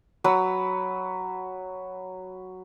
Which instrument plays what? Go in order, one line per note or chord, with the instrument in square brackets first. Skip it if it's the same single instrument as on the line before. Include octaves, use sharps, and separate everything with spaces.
[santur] F#3 B4 F#5 E6